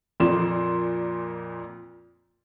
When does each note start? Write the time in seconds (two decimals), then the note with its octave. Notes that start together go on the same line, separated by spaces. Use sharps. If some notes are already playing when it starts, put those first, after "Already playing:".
0.20 F2 A#2 F3 D5 C6 E7